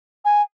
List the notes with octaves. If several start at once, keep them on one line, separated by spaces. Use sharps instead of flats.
G#5